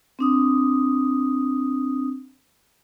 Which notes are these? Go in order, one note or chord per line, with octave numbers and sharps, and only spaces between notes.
C4 D4 D#6